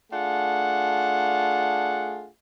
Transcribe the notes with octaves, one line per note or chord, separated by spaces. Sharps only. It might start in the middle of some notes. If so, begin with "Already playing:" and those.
A3 D4 F4 G#4 F#5